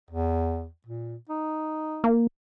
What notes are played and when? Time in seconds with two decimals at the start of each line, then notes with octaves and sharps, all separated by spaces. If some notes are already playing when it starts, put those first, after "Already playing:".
0.10 E2
0.86 A#2
1.29 D#4
2.04 A#3